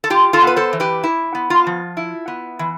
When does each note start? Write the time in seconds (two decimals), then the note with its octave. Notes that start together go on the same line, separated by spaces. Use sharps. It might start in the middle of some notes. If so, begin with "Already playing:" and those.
0.04 A4
0.10 F4 G4
0.33 F4 A4
0.42 B3
0.47 B4
0.56 A4 C5
0.73 E3
0.80 G4 B4
1.04 E4
1.35 B3
1.50 F4
1.67 F3
1.97 E4
2.28 B3
2.59 E3